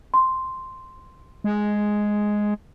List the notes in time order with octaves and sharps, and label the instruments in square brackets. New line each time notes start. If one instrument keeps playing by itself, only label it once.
[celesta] C6
[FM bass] G#3